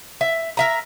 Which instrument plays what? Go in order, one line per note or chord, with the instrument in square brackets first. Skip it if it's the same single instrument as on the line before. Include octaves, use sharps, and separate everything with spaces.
[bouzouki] E5
A#4 E5 A#5